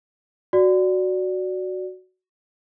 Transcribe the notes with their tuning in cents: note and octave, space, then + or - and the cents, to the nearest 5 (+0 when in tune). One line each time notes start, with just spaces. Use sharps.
F#4 +0 D5 +0